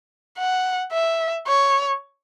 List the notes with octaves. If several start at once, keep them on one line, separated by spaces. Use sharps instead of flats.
F#5
E5
C#5